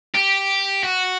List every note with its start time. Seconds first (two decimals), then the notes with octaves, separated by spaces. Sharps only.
0.15 G4
0.84 F#4